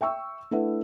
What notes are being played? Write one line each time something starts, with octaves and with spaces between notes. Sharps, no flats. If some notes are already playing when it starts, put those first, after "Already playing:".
E5 G5 C#6 E6
A3 D4 E4 B4 E5 F#5